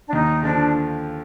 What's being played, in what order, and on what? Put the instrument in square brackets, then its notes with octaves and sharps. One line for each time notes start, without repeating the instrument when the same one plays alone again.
[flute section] D4
[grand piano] D#2 [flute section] D#4
[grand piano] D3 F3 [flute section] D4